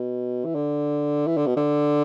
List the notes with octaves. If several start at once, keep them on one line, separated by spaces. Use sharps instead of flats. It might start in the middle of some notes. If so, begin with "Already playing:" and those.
Already playing: B2
E3
D3
E3
D3
B2
D3